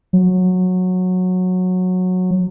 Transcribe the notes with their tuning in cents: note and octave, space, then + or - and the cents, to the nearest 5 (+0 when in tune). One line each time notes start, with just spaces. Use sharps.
F#3 -15